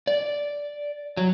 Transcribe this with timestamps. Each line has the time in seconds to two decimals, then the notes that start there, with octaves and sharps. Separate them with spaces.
0.07 D5
1.17 F#3